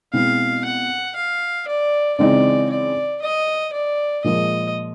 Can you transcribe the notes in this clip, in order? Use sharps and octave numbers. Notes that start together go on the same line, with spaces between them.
B2 G#3 C4 E4 F5
F#5
F5
D5
C#3 E3 G#3 C4 D#4 D5
D5
D#5
D5
A#2 F3 G#3 D#5